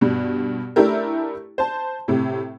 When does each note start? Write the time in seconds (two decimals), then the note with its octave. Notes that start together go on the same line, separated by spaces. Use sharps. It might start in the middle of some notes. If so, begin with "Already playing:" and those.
0.01 G2 B2
0.76 A3 D4 E4 G4 A#4
1.58 C5 A5
2.08 A2 C3